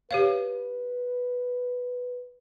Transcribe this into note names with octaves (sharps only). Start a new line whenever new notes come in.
G4 B4 C#5 F5